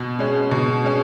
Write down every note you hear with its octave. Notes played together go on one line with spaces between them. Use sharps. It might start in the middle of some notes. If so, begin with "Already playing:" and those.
Already playing: B2
G#3 C#4
B2
G#3 C#4